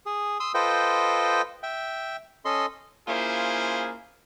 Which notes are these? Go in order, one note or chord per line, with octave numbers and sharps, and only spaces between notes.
G#4
C6 D#6 E6
F4 A4 B4 C5 D#5 G5
E5 G5
C#4 A4 D#5 C6
A#3 C#4 E4 F4 G#4 C5